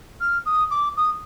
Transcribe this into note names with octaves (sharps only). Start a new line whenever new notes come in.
F6
D#6
D6
D#6